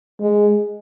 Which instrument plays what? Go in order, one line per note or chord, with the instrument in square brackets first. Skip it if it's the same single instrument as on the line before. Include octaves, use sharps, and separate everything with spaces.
[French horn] G#3